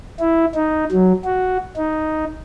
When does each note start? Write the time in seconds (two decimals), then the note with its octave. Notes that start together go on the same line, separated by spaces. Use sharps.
0.20 E4
0.55 D#4
0.91 F#3
1.25 F#4
1.76 D#4